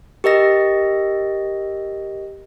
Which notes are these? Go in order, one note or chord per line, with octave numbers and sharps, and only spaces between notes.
G4 A#4 D#5 A#6